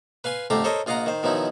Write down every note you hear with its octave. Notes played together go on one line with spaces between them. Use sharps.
B4 F5 G#5 C6
F2 D3 A3 G4 F5 A#5
A4 A#4 C5 C#5 D#5
A#1 F4 D#5 F5 F#5 A#5
D#3 C5
B2 D#3 F3 F#3 D#4 E4